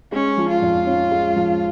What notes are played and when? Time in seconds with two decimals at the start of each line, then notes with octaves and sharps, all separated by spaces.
0.12 G#3 C#4
0.38 F3
0.49 F4
0.62 F2
0.87 C#4
1.11 G#3
1.36 F3